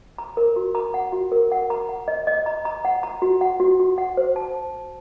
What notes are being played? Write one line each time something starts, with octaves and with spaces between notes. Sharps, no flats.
A#5
A#4
F#4
A#5
F#5
F#4
A#4
F#5
A#5
F#5
D#5
D#5
A#5
A#5
F#5
A#5
F#4
F#5
F#4
F#4
F#5
C5
A5